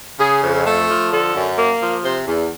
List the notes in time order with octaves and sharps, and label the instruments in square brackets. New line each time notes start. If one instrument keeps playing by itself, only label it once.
[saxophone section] C#3 G#4
F2
A3
F3
D3 A4
F#2
A#3
F3
C3 C5
E2